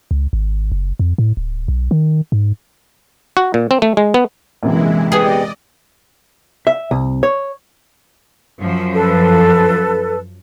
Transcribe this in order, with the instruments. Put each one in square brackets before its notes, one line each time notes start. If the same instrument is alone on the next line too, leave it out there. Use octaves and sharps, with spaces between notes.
[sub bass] C#2
G#1
F#1
F2
A2
D1
B1
D#3
G#2
[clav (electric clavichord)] F#4
A#2
C4
A3
G#3
B3
[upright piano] A#1 F#2 C3 [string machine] E3 G#3 E4
[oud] B3 G4 G#4 [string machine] D5 D#5
[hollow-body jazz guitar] E5
C2
C#5
[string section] F#2 F3
[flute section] A4 B4